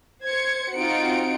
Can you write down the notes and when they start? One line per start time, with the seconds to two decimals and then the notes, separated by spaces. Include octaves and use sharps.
0.25 C5 G#6 C#7
0.75 C4 D#4 F4 F#4 C#7 D7